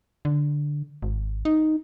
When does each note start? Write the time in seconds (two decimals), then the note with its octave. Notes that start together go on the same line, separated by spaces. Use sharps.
0.25 D3
1.03 G#1
1.45 D#4